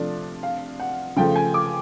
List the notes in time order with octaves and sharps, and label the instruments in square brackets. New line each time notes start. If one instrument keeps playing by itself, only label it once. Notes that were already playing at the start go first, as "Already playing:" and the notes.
Already playing: [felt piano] C3 F3 A3 D4 [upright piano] D5
[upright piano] F5
F#5
[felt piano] C#3 F3 A3 [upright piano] G5
[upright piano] G#5
D6